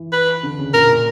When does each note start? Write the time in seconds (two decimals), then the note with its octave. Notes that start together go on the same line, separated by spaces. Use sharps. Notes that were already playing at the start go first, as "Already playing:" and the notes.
Already playing: E3
0.12 B4
0.43 D3
0.59 C#3
0.74 A#2 A#4
0.89 A#2